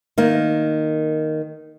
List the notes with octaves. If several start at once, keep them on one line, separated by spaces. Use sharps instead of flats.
D#3 A#3